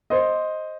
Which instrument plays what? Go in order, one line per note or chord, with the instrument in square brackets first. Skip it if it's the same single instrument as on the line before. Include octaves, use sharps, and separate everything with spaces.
[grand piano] C5 D#5